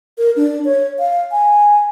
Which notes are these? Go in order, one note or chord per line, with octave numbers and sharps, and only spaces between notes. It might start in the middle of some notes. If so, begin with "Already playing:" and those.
A#4
D4
C#5
F5
G#5